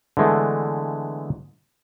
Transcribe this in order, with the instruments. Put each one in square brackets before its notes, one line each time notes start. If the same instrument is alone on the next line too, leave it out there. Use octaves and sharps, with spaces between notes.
[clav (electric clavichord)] D3 E3 G#3 A3 B3